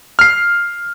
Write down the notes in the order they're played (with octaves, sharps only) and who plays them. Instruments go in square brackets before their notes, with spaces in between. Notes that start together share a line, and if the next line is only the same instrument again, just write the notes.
[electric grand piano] F6 C7